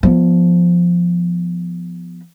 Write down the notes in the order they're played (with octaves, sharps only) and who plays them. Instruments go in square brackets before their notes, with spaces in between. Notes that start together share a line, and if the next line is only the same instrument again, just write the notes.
[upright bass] F3 B3